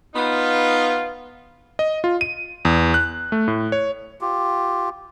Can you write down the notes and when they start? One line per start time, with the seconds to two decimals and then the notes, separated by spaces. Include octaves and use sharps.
0.15 B3 D#4 F4
1.79 D#5
2.04 F4
2.21 D#7
2.65 E2
2.94 F#6
3.32 A3
3.48 A2
3.72 C#5
4.21 F4 G4